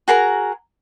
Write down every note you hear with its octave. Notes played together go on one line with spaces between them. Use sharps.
F#4 G#4 A#4 A#5